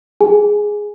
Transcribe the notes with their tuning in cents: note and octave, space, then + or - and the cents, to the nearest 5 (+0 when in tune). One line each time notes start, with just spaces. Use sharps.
G#4 +0 G#5 +5